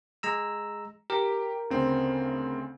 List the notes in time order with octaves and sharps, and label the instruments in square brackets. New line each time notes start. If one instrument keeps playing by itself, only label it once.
[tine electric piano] G#3 A#5 E6
[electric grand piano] G4 [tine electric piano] A#4
[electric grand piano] D2 C#3 C4